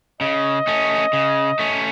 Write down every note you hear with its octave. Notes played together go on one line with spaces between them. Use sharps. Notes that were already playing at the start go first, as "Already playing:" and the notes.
C#3 D#5
A3 C#4
C#3
A3 C#4